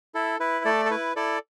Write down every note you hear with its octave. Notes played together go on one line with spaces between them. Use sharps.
E4 A4
E4 B4
A3 A4 D5
A4
E4 B4
E4 A4 D5